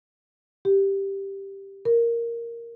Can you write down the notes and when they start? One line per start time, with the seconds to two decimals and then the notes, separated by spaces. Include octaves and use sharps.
0.65 G4
1.85 A#4